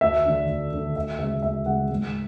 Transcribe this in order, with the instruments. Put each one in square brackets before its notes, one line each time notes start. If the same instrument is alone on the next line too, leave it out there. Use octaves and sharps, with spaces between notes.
[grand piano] D2 E5
D3 A3 D4
D2
D3 A3 D4
D2 E5
C#3 G#3 E5
D2 E5
C#3 G#3 F#5
G#2